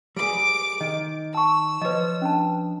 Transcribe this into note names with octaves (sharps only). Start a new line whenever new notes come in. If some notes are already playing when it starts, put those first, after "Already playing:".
G3 G#4 D6 D7
D#3 D#5
A5 C#6 E6
F3 B4 C#5 D#5
C#4 D4 A5